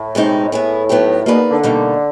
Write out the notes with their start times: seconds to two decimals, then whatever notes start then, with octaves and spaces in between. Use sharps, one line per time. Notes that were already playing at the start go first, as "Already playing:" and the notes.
Already playing: A2
0.15 B2 G#3 C4 D#4 G4
0.52 A2 B3 E4 G#4
0.89 F#3 B3 D#4 G4
1.26 B2 A#3 D#4 G#4 B4 D5
1.51 D3
1.63 B2 G3 A#3 D#4